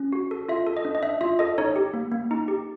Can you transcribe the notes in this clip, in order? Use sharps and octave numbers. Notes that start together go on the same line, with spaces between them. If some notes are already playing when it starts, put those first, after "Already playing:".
Already playing: C#4
F#4
A4
F4 E5
A4
D#5
D4
D#5
D4 E5
F4 E5
A4 D#5
D#4 C#5
G4
A#3
A#3
D#4
G4